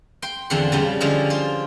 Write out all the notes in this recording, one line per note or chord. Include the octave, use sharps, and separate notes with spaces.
G5 C6
E2 D3 F3 C4 F#5 C6
C#3 F3 G3
D3 F3 G#3 C#4
F4 C5